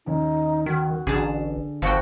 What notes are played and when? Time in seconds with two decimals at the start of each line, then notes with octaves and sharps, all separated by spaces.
0.06 D#2 C#4 D#4
0.66 D#3 F#4
1.07 A1 D3 G#4 A5
1.82 G1 F3 F#4 G5